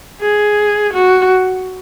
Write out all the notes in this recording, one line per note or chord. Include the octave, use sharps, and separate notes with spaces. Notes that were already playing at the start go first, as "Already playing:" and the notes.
G#4
F#4